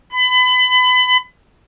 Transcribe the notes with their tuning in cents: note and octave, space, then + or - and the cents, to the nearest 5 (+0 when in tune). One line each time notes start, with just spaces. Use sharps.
B5 +30